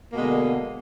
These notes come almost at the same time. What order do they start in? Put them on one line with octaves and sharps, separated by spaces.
A#3 B2 G#3 D3